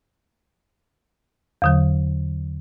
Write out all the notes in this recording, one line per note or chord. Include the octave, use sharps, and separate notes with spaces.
E2 D3 F#3